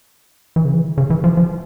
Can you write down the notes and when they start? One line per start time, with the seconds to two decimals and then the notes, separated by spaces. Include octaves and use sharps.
0.56 E3
0.65 C#3
0.74 E3
0.98 C#3
1.10 E3
1.24 F3
1.37 F3